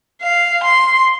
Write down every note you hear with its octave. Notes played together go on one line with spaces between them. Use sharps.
F5
C6